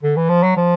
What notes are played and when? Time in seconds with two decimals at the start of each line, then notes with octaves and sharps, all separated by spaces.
0.03 D3
0.16 E3
0.29 F3
0.43 F#3
0.56 F3